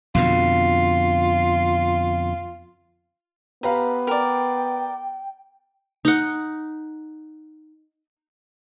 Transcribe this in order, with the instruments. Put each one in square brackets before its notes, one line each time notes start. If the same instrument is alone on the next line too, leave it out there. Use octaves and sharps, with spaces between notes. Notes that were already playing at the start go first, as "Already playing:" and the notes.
[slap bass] F2 B2 D3 [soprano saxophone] F4
[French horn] B3 [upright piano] G4 B4 F5 [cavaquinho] A#5
[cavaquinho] A#4 D5 [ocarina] G5
[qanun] D#4 F#5